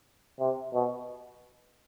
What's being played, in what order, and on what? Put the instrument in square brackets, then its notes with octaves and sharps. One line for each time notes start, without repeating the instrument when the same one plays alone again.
[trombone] C3
B2